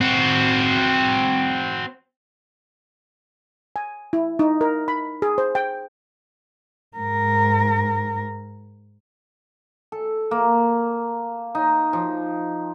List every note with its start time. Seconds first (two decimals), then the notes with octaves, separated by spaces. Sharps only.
0.01 C4 F#4
3.76 G#5
4.13 E4
4.39 D#4
4.61 A#4
4.88 B5
5.22 G#4
5.38 C5
5.55 G5
6.97 G#2 A#4
9.92 A4
10.31 A#3
11.55 D#4
11.93 F3